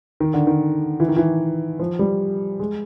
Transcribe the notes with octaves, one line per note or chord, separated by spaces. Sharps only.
D#3
D3
D#3
E3
D#3
E3
F3
G3
G#3